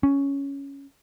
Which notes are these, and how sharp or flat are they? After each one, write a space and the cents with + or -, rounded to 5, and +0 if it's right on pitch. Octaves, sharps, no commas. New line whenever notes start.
C#4 +5